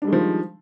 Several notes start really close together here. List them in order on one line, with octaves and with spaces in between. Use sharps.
D4 G3 G#3 D#3 F3